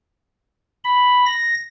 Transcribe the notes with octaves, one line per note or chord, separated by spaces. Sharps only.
B5
A#6